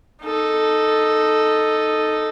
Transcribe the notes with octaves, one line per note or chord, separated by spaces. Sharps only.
D#4 A4